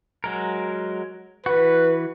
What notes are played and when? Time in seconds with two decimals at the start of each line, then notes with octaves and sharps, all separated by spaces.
0.24 F#3 G#3 A#4
1.46 E3 F#4 B4